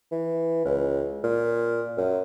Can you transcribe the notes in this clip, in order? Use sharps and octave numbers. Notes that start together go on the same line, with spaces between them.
E3
C#2
A#2
F#2